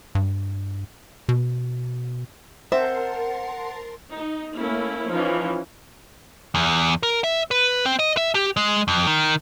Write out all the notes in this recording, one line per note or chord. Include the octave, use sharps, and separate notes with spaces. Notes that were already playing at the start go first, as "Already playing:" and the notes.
G2
B2
C4 A#4 C5 E5 F#5 A5 C6
D#4
A3 A#3 C#4 E4
E3 F3 C#4 D#4
E2
A#4
E5
B4
C4
D#5
E5
G4
G#3
F2
D#3